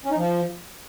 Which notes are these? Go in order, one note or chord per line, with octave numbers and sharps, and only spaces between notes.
C#4
D#4
F3